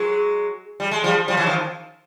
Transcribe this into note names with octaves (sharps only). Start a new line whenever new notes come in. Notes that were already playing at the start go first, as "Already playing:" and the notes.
Already playing: F#3 G#3
G3
G#3
F3 G3
F3 G3
E3 F#3
D#3 F3